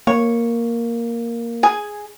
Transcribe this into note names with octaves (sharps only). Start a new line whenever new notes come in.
A#3 C#5
G#4 G#5